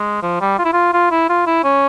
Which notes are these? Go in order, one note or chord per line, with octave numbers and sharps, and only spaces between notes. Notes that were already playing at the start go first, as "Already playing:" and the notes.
Already playing: G#3
F3
G3
F4
E4
F4
F4
E4
F4
E4
C#4